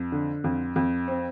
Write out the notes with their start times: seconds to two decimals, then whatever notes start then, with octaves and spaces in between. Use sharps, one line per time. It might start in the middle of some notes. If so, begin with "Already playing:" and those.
Already playing: F2
0.12 D3
0.44 F2
0.76 F2
1.08 C4